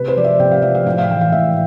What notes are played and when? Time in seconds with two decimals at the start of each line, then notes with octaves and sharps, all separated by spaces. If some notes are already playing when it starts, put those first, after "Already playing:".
Already playing: C3 B4
0.08 C5
0.17 F3 D5
0.24 E5
0.40 C3 G5
0.52 F5
0.62 F3 E5
0.75 F5
0.86 A2 G5
0.98 F5
1.10 E3 G5
1.21 F5
1.32 A2 E5